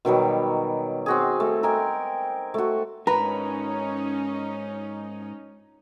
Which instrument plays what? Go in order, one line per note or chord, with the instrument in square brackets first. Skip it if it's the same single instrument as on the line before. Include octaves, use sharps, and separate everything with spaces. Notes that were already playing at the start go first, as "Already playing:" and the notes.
[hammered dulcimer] B2 D#3 F#3 G3
C4 F#4 G#4
A3
A#4 D#5 G5 G#5
A3 F#4
[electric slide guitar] G#2 A#4 [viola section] C#4 D#4 [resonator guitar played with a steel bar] B4 [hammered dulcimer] A#5